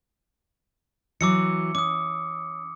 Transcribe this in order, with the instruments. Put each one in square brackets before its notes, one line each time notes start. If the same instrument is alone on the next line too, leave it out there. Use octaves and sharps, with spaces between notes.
[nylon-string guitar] E3 F#3 [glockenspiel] D6 E6 C#7
[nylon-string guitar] C#4 [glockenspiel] D6 D#6